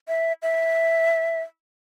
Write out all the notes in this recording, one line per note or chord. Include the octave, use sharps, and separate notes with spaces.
E5
E5